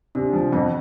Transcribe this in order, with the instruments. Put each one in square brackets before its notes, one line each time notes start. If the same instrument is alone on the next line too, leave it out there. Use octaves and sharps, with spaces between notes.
[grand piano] C3 [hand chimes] D4
[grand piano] F3
[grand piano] F2 [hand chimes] C4